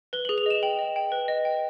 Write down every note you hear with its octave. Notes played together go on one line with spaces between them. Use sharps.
B4 G7
F#7
G#4
F7
D#5 E7
G5 F#7
D#5
G5
B4
D#5
G5